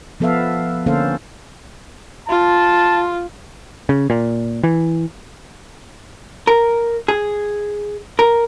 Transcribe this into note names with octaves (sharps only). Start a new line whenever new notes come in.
F3 B3 A4 B4 E5 F5
D3 A#3 C#4 A4 C5 F5
F4 A5
C#3
A#2
E3
A#4
G#4
A#4